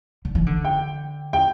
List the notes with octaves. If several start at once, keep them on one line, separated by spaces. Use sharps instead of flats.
D3
E3
D3
G5
G5